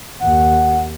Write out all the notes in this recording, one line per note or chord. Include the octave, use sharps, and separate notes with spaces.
D#2 F#5